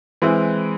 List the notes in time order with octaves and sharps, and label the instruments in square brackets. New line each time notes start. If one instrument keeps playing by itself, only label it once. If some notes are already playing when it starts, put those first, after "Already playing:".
[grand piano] E3 G#3 C4 E4